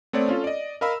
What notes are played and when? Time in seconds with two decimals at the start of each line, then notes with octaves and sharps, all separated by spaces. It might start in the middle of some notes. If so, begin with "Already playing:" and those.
0.13 A3 B3 C4 C#5 D5
0.29 C#4 F4 A4
0.44 D5 D#5
0.81 A#4 D#5 F5 B5 E6